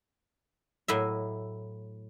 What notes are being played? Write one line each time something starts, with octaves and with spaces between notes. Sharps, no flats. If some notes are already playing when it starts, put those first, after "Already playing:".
A2 F#3 E4 D#5 E5